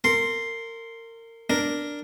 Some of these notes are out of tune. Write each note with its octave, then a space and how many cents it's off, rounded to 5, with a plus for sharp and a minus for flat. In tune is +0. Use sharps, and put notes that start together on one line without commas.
A#4 -30 C6 +5
D4 +0 A#4 +0